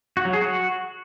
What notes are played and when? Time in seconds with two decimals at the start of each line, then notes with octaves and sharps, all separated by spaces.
0.17 F#4
0.25 F#3
0.33 G#4
0.42 F#4